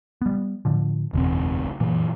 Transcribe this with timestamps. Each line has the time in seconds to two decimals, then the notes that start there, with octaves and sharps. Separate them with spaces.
0.22 G3 B3
0.65 A2 D3 F3
1.13 F#1 B1 E2 C4
1.80 F#2 A#2 E3